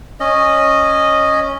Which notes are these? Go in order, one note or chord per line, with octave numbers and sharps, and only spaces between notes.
C#4 D#5